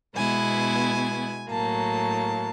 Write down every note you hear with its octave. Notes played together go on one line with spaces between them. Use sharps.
B2 G#3 B3 E4 G#5
A2 F#3 A#3 A5